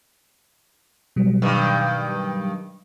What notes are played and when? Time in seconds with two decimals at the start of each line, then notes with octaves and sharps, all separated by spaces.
1.16 B2 F#3 G3
1.42 G2 D#3